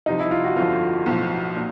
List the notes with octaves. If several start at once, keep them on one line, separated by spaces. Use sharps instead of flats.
C2 C3 F3 D#4
E4
F4
F#4
G1 F2 D3 F3 F4
B1 A2 F3
A#2